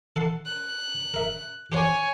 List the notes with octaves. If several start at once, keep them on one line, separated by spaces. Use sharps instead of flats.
A4 F#5 C6
F#6
A#4 E5
G4 C5 C#5 F#5 G#5